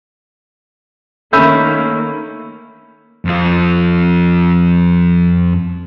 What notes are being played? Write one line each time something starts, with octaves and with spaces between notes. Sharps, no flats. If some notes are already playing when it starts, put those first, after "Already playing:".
D#3 A3 A#3 C#4 B5 E6 G6
F2 F4